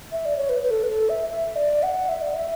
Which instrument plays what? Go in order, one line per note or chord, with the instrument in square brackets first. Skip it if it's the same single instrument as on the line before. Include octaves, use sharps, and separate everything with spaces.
[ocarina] E5
D5
C#5
B4
B4
A4
B4
A4
E5
E5
D5
F#5
E5
D5
E5